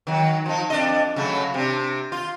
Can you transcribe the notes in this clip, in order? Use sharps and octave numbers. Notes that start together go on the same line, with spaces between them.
D#3 F#3
F3 D#4
F2 D4 D#5
C#3 F#3 A3
C3 D4
F4